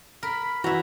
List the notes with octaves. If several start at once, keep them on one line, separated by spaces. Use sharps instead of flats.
A#4 B5
E3 E4 F#4 A#5